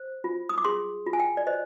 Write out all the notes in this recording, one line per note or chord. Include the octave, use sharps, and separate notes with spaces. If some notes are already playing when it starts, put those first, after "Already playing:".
Already playing: C5
F4
D#6
D6
G#4 C6
F4
G#5
G5
D5
C5 D#5